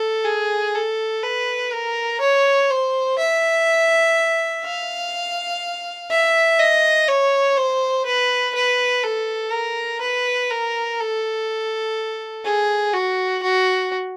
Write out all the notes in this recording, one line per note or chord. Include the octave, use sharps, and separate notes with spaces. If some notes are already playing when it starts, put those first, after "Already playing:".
Already playing: A4
G#4
A4
B4
A#4
C#5
C5
E5
F5
E5
D#5
C#5
C5
B4
B4
A4
A#4
B4
A#4
A4
G#4
F#4
F#4